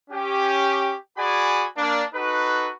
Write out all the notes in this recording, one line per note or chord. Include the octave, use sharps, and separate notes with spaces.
C#4 G4
F#4 G#4 D5 G#5 B5
A#3 D4
D#4 F#4 A4 B4